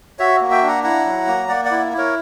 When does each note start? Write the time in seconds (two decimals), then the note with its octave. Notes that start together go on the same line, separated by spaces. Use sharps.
0.19 F#4 C#5 E5
0.41 A#3
0.51 E5 G5
0.62 D4
0.68 F#5 A#5
0.83 E4 F#5 A#5
1.05 F#3
1.27 A#3
1.48 A#3 D5 F#5
1.65 D5 F#5
1.71 E4
1.93 E4
1.98 A#4 C#5